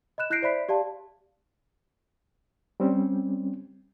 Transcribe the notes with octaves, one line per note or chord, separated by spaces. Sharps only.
D#5 B5 F#6 E7
E4 F#6 G6 A#6 C7 D7
C5 D5 E5 B5 B6
G4 D5 F5 A5
G3 C4 C#4